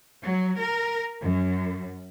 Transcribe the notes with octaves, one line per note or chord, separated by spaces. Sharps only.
F#3
A#4
F#2